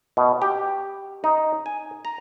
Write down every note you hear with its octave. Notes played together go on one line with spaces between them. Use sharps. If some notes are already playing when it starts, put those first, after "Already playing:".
B2
G4
D#4
G#5
A#5